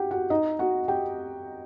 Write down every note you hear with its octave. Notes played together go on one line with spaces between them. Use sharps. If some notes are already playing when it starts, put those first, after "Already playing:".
Already playing: F#4 G4 F#5 G5
F#4 F#5
D#4 D#5
F#4 F#5
G4 G5